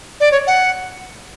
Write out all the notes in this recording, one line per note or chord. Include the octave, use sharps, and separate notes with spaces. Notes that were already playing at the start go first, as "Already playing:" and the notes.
D5
C#5
F#5